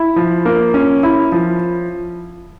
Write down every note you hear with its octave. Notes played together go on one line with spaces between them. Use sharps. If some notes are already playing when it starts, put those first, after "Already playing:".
Already playing: E4
F3
A#3
C#4
E4
F3